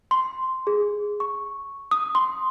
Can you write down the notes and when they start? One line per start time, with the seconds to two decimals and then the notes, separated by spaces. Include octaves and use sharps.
0.11 C6
0.67 G#4
1.20 C#6
1.91 D#6
2.15 C6